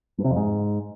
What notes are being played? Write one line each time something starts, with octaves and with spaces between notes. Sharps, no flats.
G2
C3
F2
G#2